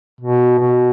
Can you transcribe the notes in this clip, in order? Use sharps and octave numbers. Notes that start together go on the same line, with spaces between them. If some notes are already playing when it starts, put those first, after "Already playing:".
B2
B2